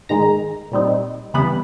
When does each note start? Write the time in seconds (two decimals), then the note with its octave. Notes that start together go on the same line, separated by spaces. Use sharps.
0.09 G#2 D#3 G#3 A#5
0.72 A#2 G3 C4 D#4
1.34 C#3 E3 G3 B3 B5